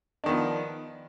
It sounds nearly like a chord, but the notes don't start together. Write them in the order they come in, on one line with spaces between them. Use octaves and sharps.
D4 D#3 B3 F3